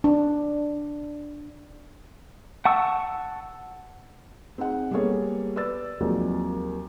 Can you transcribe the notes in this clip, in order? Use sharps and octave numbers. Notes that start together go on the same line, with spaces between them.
D4
F#5 A5 C#6 E6
C4 D#4 G#4 F#5
G3 A#3 B3 G#4 A4 C#5
B4 D5 E6 A6
D#2 F3 F#3 G#3 A#3 C4